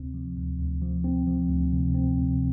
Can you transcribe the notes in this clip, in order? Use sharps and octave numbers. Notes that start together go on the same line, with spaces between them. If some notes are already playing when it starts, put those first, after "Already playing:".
Already playing: D2 C3 C4
F3
D2
D2
F3
C4
F3
D2
C3
C4
C3